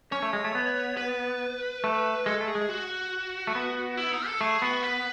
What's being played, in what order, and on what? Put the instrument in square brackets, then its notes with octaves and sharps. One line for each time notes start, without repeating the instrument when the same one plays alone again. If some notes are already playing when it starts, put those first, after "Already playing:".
[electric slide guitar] C#4 [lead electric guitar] C#5
[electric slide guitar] A3
G#3
A3
B3
[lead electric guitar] B4
[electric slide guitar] A3
[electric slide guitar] G#3 [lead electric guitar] A4
[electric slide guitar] A3
[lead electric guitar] G#4
[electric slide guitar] G#3
[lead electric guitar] F#4
[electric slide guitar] A3
B3
[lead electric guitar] E4
D#4
A4
[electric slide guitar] A3 [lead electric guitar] G#4
[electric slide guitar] B3 [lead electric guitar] F#4
[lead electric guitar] B4